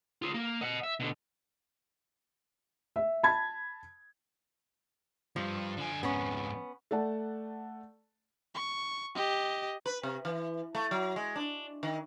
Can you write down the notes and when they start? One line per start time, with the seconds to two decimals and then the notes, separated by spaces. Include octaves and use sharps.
0.22 F4 G#4
0.34 A#3
0.61 D#5 F#5
0.83 E5
1.00 B2 D3
2.96 E5
3.23 A5 B5 G#6
5.36 G2 F3
5.77 D3 G#5
6.03 F2 G#2 B3 C#4
6.91 A3 D5 F#5 A5
8.54 C#6
9.15 G4 D#5
9.86 B4
10.03 C3
10.25 E3
10.75 A3
10.91 F#3
11.16 G#3
11.36 D4
11.83 D#3